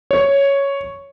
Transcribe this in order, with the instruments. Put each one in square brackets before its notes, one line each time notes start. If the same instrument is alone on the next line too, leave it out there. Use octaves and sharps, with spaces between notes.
[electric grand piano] C#5